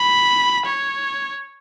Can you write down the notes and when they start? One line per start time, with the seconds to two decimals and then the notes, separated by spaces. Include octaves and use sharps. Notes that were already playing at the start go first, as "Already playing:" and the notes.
Already playing: B5
0.66 C#5